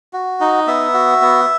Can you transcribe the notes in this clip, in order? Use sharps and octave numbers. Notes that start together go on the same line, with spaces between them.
F#4
D#4
B3 E5
F#4
B3